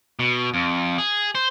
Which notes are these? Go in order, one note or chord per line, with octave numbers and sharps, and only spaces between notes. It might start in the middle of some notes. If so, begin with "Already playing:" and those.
B2
F2
G#4
C5